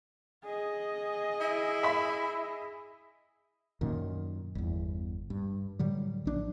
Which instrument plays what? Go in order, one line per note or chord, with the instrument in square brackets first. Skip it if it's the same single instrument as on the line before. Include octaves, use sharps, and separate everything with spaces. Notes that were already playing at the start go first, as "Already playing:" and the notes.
[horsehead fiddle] G#4 D#5
[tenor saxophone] E4
[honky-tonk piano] E5 B5
[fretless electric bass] F#2 A#2 D#3
G1 E2
G2
A2 D3 F#3 G3
A#1 D4